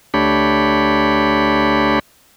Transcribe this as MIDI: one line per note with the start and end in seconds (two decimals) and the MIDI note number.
0.14 1.99 38
0.14 1.99 57
0.14 1.99 62
0.14 1.99 67
0.14 1.99 73
0.14 1.99 83